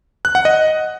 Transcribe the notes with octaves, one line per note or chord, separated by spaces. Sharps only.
F#6
F#5
D#5